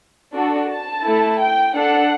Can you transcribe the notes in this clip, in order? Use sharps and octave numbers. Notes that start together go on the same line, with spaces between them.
D4 F#4 A4
A5
A3 E4 A4
G5
D4 A4 F#5